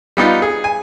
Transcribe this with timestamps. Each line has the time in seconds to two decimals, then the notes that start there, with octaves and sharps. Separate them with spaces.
0.17 G3 B3 D#4 F4
0.42 G#4
0.64 G#5